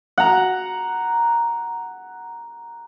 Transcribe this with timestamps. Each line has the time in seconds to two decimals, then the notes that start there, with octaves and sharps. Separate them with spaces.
0.18 F#5 A#5